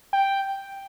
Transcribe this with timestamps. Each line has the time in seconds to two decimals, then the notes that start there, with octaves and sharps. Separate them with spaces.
0.13 G5